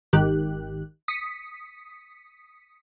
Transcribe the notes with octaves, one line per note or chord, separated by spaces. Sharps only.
G#1 D#3 G4 F#6
D#6 B6 C#7